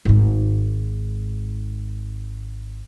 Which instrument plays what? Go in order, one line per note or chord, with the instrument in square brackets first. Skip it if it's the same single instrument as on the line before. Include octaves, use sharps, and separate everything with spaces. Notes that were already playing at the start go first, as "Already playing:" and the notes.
[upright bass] G#1 G#2